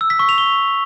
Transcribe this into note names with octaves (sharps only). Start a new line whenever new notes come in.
E6
B6
C#6
F7
G7